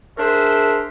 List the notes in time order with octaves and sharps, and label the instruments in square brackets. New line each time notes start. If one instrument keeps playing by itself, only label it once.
[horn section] D4 G#4 A#4 C5 E5